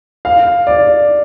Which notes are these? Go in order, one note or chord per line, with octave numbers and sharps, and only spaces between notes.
F5
D5